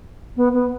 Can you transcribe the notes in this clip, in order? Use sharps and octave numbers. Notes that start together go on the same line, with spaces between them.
B3
B3